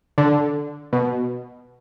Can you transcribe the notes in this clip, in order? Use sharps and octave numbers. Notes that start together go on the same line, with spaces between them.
D3
B2